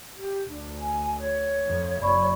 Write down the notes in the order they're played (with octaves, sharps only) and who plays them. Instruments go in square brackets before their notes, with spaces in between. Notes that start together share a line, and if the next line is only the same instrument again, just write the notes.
[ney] G4
[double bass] D2 [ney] D4
[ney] G#5
C#5
[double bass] F2
[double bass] F#1 F#2 [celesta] D5 B5 C#6